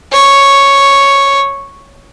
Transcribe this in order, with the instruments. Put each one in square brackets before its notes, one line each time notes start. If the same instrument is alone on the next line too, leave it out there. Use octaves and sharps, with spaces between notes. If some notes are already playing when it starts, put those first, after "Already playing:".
[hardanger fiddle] C#5